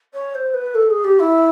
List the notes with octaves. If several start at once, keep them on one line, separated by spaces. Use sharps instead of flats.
C#5
C5
B4
A4
G#4
G4
E4